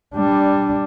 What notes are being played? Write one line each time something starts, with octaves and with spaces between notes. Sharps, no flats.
G3 D4